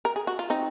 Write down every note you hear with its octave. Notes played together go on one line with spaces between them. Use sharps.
A#4
G#4
F#4
F4
C4 D#4